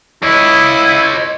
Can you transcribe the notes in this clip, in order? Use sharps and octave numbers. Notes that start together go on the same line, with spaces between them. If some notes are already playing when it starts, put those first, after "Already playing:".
E4 C#5 D#5